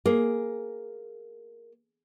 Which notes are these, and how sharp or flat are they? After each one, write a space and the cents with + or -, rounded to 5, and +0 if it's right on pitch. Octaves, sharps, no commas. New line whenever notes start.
A#3 +0 G#4 +0